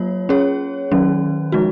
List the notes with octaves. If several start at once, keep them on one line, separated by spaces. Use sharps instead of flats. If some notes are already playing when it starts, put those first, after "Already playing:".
Already playing: F#3 A#3 F4 C#5
C#4 G#4 C#5
D#3 F#3 C#4
F3 G#3 D#4 F#4